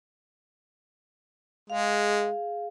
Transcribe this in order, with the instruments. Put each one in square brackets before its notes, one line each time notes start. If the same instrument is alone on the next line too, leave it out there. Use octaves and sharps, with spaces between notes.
[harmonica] G#3 [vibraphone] G#4 F5